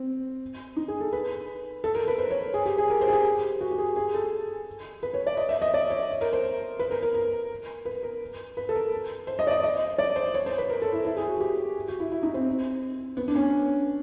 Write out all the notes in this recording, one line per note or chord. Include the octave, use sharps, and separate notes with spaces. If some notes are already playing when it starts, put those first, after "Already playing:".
Already playing: C4
D#4
G#4
A4
B4
A4
A#4
B4
C5
C#5
G#4
G4
G#4
A#4
C5
G#4
G4
F#4
G4
G#4
G#4
A4
B4
C#5
D5
D#5
E5
D#5
D5
C#5
A#4
C5
B4
A#4
A#4
A#4
B4
A#4
B4
A4
A#4
C5
D#5
D5
D#5
D#5
D5
C5
C#5
C5
B4
A#4
A4
E4
E4
G#4
F#4
G4
F#4
E4
E4
D#4
C4
B3
D4
C#4